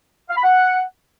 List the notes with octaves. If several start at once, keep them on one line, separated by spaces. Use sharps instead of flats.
F5
B5
F#5